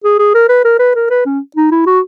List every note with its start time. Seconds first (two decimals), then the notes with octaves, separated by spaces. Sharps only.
0.04 G#4
0.19 G#4
0.34 A#4
0.49 B4
0.64 A#4
0.79 B4
0.95 A#4
1.10 B4
1.26 C#4
1.56 D#4
1.71 E4
1.86 F#4